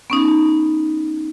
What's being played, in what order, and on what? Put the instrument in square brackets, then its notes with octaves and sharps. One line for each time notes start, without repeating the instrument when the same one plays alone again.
[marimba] B3 C#4 D#4